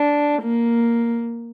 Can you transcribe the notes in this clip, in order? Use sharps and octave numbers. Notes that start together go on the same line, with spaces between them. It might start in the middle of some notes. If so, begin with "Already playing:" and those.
Already playing: D4
A#3